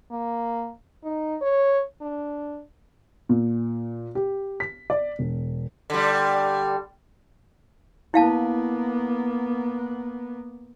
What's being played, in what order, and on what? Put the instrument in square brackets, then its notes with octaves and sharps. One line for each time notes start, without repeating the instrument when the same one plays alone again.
[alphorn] A#3
D#4
C#5
D4
[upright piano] A#2
G4
B6
D5
E1
[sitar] D3 G3
[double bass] A#3 B3 [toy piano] E4 F5 A5